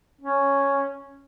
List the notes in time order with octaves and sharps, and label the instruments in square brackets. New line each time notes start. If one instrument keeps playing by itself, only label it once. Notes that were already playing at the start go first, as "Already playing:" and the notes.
[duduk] C#4